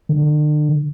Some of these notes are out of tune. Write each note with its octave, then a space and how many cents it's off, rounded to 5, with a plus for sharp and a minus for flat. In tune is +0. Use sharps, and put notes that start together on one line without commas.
D3 +40